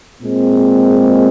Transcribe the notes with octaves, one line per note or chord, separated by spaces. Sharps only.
A#2 G#3 C4